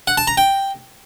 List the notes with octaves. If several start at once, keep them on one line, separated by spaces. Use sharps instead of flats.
F#5
A5
A#5
G5